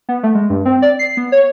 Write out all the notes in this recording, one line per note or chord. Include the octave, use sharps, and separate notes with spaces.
B3
A3
G#3
G2
C4
D5
C7
B3
C#5